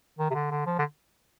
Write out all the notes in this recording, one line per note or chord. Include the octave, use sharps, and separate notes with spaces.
D#3
C3
D3
D3
F3
D3